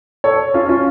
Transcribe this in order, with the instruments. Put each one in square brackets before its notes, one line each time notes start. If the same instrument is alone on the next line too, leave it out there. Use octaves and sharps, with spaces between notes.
[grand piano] A4 C#5
C#4 F4
C#4 F4